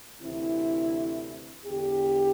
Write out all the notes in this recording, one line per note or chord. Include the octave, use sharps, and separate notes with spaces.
D2 C3 E3 E4
E2 D3 G4